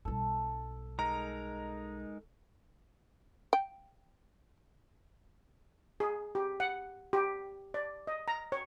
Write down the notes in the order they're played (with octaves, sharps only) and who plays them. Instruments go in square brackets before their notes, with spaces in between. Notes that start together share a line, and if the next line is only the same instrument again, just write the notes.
[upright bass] B1 G3 [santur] A4
[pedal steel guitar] G#3 D#4 A#4 [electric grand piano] A#5
[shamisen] G5
[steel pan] G#4
G4
F#5
G4
D5
D#5
A#5
C#5